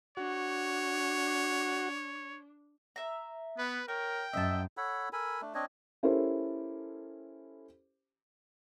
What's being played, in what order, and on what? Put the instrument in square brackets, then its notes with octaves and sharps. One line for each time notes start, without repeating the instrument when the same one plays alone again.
[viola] D4 [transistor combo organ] F#4 [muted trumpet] C#5
[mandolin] E5 A#5
[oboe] B3 [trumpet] B4
[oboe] A#4 [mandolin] C#5 [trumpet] G5
[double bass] F#2 [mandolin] D#5 A5 [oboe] E5
[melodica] A4 C#5 F#5 B5
A4 A#4 G#5 B5
A3 D4
C4 D4 C#5 D#5
[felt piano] C#4 E4 G4 A4 A#4 C5